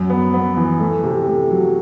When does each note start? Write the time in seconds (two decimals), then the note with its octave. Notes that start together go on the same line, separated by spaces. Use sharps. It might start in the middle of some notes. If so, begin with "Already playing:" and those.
Already playing: F#2
0.10 B3
0.34 B3
0.57 E3
0.80 A3
1.04 C3
1.27 A3
1.51 F#3